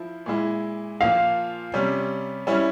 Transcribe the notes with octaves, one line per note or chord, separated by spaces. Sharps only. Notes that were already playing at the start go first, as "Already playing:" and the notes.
Already playing: F3 E4
A#2 G#3 E4
A#2 F3 A#3 F4 F5
C3 G3 C#4
G3 C#4 E4